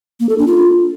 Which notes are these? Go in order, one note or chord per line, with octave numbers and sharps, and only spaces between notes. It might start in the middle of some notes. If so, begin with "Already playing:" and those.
A#3
A4
D4
F4